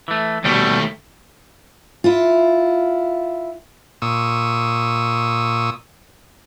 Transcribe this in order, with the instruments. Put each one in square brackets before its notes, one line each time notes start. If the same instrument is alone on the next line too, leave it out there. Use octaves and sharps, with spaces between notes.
[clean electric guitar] E3 A3
[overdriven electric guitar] D#2 A3 [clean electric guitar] B2 G3
[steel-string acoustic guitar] E4 F4
[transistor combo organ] A#2 C#6 D#6 E6